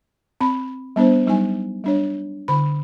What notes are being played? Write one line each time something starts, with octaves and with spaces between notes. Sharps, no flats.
C4 B5
G3 B3 D4 C5
F#3 G3 D#4 G#5
G3 D4 C#5
D3 B5